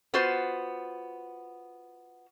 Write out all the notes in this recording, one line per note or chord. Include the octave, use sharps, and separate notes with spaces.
B3 F4 F#4 C5